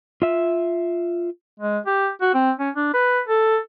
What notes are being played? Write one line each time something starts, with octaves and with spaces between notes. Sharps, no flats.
F4 E5
G#3
G4
F#4
C4
C#4
D4
B4
A4